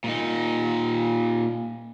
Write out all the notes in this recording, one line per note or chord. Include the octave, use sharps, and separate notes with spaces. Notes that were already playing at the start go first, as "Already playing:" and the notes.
A#2 D#4